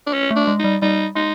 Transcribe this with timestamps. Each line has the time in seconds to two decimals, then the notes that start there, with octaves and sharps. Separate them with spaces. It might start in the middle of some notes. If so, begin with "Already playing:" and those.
0.06 D4
0.14 C#4
0.31 A3
0.36 D4
0.47 G#3
0.59 D#4
0.64 G3
0.82 G3 D#4
1.15 G#3 D#4